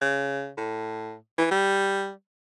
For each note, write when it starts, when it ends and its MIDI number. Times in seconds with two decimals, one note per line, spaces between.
0.01 0.50 49
0.57 1.15 45
1.38 1.46 52
1.51 2.10 55